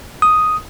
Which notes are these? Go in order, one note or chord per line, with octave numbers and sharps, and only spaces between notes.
D#6